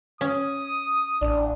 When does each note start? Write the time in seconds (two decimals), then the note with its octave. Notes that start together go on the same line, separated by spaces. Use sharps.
0.21 C#4 D#6
1.21 A1 D4